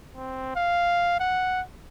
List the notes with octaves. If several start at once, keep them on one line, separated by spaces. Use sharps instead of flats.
C4
F5
F#5